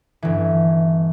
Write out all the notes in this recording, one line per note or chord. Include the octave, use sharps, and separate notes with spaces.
G1 E3